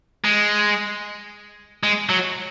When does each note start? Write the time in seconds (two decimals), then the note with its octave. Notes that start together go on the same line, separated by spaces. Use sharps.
0.25 G#3
1.83 G#3
2.09 F#3